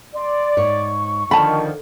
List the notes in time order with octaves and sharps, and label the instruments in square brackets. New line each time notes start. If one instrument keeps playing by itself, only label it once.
[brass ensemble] D5 [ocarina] C6
[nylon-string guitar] G#2 C#5 [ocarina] C#6
[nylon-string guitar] D3 [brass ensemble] D#3 F3 [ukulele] A5 B5